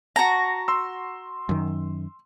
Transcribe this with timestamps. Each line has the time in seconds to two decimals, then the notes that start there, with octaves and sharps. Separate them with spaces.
0.16 F#4 A5 A#5
0.68 C6 E6
1.49 F#2 D#3